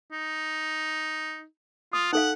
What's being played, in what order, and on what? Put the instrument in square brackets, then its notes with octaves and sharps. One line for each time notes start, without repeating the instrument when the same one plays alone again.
[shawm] D#4
[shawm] F4 [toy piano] D#6
[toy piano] D#4 A4 F5 [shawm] F#5